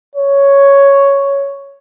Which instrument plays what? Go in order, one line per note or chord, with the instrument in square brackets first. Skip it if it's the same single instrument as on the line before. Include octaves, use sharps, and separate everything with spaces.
[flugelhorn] C#5